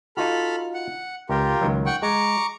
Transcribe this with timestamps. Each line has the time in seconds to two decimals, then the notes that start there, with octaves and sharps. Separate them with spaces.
0.17 D#4 F4 F#4 A4 B5 F6
0.74 F#5
1.29 C#2 F4 G4 A#4
1.61 C#2 D#3 F#3
1.86 F#5 G5 C#6
2.02 G#3 A#5 C#6 D6